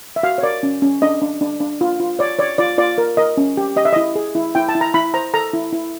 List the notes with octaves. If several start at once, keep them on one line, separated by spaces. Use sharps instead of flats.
E5
F#4 F5
C#5
A#4 D5
C#4
C#4
D4 D#5
D4
D4
D4
F4
F4
C#5 D5
C#5 D5
F4 D5
F4 D5
A#4
A#4 D#5
C#4
G4
G4 D#5
E5
E4 D#5
G#4
E4
E4 G5
A5
E4
A#5
E4 B5
C5 A#5
A4 A#5
E4
E4